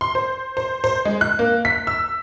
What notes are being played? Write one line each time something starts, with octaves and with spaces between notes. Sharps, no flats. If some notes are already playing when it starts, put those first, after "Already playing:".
C6
C5
C5
C5
G#3
F#6
A#3
B6
E6